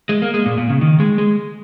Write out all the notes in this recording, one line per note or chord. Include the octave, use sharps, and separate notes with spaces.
G#3
A#3
G#3
A#2
A#2
C#3
D#3
G#3
G#3